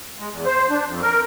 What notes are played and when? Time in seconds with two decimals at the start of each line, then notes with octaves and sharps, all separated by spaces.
0.19 G#3
0.30 E2
0.46 C5
0.70 D4
0.87 F2
1.02 A#4